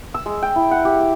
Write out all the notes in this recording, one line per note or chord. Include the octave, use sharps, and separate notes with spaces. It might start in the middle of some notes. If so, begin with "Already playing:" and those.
E6
G#3
G5
E4
F#5
G4
D6